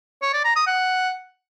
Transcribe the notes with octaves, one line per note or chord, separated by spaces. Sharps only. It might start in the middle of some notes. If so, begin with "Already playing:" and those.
C#5
D5
A#5
D#6
F#5